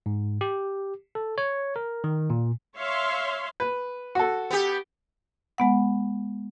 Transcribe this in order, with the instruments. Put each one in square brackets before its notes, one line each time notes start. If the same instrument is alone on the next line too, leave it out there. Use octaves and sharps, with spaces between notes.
[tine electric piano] G#2
G4
A4
C#5
A#4
D#3
A#2
[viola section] C#5 E5 F5 C6
[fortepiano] B4
F#4 A4
[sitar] B3 G4
[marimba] G#3 B3 F#5